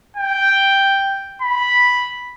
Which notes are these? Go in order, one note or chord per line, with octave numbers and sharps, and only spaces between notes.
G5
B5